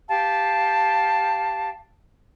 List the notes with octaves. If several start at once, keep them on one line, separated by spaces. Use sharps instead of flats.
G4 F5 G5 A5